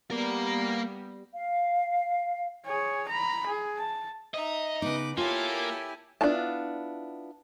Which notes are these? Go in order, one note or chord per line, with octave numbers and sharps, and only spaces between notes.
G3 A#3 B3 A#4
F5
G#4 C#5
A#5 B5
G#4
A5
D#4 D#5 E5
C#3 B3 D#4 B4 D6
A#3 E4 F4 G4 A4 C#5 G#5
B3 D4 E4 F4 A5